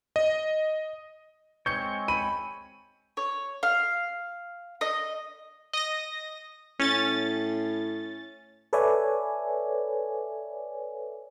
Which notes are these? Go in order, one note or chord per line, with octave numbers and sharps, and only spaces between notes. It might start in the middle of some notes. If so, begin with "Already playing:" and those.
D#5
G#3 C4 C#5 G6 C#7
B5 D#7
C#5
F5
D#5
D#5 A#6
A2 C#4 A6
A4 B4 C#5 D5 E5 G#5